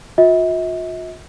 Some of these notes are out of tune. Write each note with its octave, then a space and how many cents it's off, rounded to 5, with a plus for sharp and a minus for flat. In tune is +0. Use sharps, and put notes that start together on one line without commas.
F4 +45 E5 -45